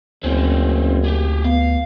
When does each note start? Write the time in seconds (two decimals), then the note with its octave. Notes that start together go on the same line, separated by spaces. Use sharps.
0.23 F#1 D2 C4 C#4
1.04 G4 G#4
1.44 B3 F5